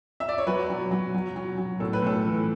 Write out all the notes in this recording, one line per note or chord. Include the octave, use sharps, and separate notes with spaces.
E5
D5
C#5
F#3 B4
F#3
F#3
F#3
F#3
F#3
A2 A4
B4
A2 A4
E3